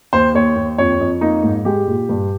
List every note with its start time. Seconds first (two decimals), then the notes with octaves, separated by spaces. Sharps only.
0.13 D#2 C5
0.34 D#2 C#5
0.56 D#2
0.78 F2 C#5
1.00 F2
1.21 A#3 D#4
1.43 G#2
1.65 G#3 G4
1.88 A#2
2.09 G2